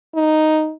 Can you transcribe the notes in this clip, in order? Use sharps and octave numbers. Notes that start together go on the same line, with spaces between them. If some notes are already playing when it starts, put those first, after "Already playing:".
D#4